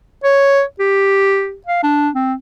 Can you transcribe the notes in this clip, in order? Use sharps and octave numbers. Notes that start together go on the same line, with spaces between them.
C#5
G4
F5
D4
C4